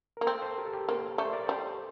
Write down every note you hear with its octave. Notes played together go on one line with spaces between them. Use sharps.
A#3 A#4
C4 A4 C5
A4 C5
G4 A#4
A4
G4 A#4
A#3 A4 C5
A3 D5
C5
A#4 D5
D5
G3 A4 C5